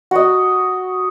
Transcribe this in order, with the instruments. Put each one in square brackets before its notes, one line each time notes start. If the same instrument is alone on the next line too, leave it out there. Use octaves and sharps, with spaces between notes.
[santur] F#4 D#5